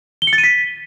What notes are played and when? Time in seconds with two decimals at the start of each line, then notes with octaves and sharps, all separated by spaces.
0.22 G7
0.27 C#7
0.33 A6
0.38 D#7
0.43 B6